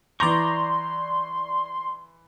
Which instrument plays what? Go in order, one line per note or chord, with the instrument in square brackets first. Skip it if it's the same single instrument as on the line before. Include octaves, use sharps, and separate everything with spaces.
[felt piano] E3 A#6 [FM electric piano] D5 G6 [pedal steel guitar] A#5 C#6 [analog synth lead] C6